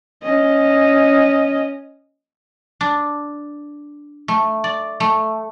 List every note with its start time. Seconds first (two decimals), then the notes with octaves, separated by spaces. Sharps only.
0.23 C#4 D#5
2.81 D4
4.28 A3
4.64 D5
5.00 A3